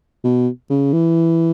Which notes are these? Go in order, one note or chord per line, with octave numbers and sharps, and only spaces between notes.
B2
C#3
E3